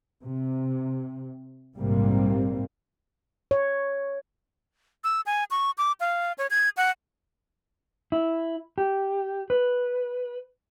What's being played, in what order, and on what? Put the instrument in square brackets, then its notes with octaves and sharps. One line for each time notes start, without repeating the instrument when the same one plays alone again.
[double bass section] C3
A#1 G#2 C3 G3 A#3 C4
[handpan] C#5
[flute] E6
G#5
C#6
D6
F5
C#5
G#6
F#5
[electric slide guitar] E4
G4
B4